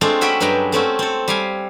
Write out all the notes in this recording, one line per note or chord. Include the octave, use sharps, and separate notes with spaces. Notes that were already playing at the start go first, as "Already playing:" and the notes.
G#3 A3 C4 D4 F4
C#4 F#4 E5 F#5 G5 B5
G2 F#3 G#3 B4 G5 A#5
A3 C4 C#4 F#4
C4 A4
G3 F5 G#5